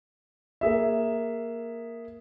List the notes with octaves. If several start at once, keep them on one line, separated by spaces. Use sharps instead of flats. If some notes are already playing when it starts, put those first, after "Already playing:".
A#3 G#4 E5